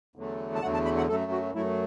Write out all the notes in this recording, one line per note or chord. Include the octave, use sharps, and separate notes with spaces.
E2 D3 F#3 A3
A5
E2 D3 F#3 A3 F#5
A5
B5
F#5
F#2 F#3 A3 A4
F#4
F#2 F#3 A3 E4